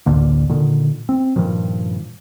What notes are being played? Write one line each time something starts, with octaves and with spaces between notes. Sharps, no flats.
A1 D2 D3 A#3
A#2 D3 D#3
C4
G2 A#2 D#3 F3